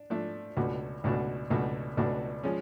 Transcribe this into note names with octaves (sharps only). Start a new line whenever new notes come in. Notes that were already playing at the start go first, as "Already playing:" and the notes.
Already playing: D4
F3 A3 D4
C#2 B2 A3 D4 F#4
C#2 B2 A3 D4 F#4
C#2 B2 A3 D4 F#4
C#2 B2 A3 D4 F#4
F3 G#3 C#4